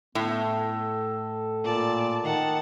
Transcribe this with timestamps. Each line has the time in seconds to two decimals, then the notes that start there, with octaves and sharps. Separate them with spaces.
0.15 A2 B3
0.59 A4
1.65 A#2 D5 A5
2.24 D#3 F#5 A5